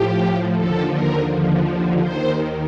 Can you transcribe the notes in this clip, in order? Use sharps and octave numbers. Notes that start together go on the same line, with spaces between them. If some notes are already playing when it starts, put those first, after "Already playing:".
Already playing: A2 F3 G4
D#2 D3 F3 A4
A#4
D#2 D3 F3
D#2 D#3 C5